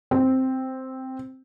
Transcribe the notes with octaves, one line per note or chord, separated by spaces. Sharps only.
C4